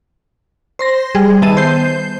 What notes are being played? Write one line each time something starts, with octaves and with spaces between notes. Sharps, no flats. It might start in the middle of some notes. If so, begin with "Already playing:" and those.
C5 C6 A#6
G3 G#4
D#3 B3 E5 A5 D#7
C5 G6 C7